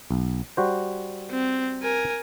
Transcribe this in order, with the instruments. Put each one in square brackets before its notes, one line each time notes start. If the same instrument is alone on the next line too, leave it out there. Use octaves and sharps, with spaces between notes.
[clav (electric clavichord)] B1
G3 F#4 C5
[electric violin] C4
A#4 G#5